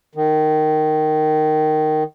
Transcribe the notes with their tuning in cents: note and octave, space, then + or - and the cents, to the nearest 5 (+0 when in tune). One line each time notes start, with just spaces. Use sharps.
D#3 -10